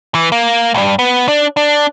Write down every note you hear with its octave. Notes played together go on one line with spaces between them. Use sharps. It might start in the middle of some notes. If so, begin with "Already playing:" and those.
E3
A#3
C2 G2
B3
D4
D4